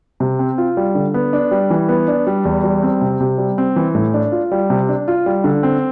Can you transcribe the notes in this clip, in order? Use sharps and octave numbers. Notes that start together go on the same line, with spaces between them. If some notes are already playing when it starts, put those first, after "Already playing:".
C3
C4
F4
G3
D3
B3
D4
G3
E3
B3
D4
G3
E2
G3
C4
C3
C3
G3
C4
E3
A2
D4
F4
G3
C3
D4
F4
G3
D3
C4